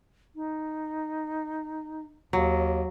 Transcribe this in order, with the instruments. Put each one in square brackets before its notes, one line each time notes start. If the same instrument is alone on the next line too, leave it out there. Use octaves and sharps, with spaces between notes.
[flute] D#4
[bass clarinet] D#2 [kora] F#3